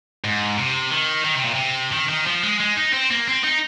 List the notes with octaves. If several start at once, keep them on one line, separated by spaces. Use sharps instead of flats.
G#2
C3
D#3
D#3
C3
A#2
C3
D#3
D#3
F3
G#3
G#3
D#4
C4
A#3
C4
D#4